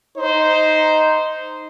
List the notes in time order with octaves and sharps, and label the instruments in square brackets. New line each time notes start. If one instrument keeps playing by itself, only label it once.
[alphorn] D#4 [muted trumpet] C5